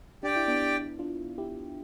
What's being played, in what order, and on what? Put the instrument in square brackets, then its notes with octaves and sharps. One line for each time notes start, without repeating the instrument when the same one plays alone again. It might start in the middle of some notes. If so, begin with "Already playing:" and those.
[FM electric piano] D4 [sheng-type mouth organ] G4 D5 G5
[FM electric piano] E4
B3 D4
D4 F4
E4 G4